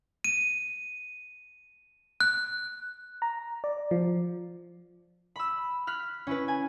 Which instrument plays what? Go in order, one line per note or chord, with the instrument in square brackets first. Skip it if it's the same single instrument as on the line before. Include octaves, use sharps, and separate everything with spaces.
[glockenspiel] D#7
F#6
[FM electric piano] A#5
D5
F3
[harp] B5 E6
F6 F#6 B6
C#4 E4 B4
G#5